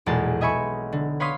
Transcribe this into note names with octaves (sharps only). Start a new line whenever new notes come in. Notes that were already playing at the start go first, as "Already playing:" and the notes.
B1 E2 A#2 G#3 A4 A5
D#5 E5 G#5 B5 C#6 C#7
D3
B4 C#5 F5 C6 D#6 B6